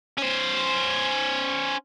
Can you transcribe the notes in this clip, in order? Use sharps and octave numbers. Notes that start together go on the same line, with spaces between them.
C#4 C5